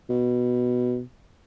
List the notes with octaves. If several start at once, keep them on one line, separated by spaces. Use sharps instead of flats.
B2